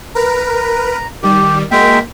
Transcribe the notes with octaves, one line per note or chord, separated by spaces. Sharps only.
A#4 B4 A#5
D#3 G3 G4
G#3 A#3 F#4 A#4 E5 G5